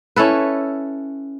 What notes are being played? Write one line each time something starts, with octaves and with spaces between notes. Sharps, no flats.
C#4 E4 A4 B4